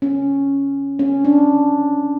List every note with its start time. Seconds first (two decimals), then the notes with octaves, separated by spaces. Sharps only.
0.02 C#4
0.99 C#4
1.25 D4